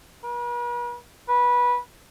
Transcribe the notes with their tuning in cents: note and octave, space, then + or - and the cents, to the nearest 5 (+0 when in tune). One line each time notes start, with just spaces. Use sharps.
B4 -45
B4 -15